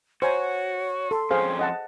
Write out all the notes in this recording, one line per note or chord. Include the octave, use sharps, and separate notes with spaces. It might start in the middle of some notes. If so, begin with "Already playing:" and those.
F#4 C5 C#5 G#5 A#5
A4 C6
F2 C#4 G#4 C5 F5
D#5 F#5 A5